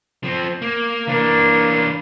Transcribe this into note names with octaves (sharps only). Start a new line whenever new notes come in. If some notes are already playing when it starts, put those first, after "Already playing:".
F3 C4
A#3
E3 A#3 D4